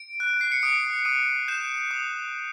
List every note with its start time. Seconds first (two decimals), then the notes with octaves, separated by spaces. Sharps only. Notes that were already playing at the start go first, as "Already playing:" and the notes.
Already playing: D7
0.20 F#6
0.41 C7
0.52 C#7
0.62 D#6 D7
1.05 D#6 D#7
1.48 G6 E7
1.91 D#6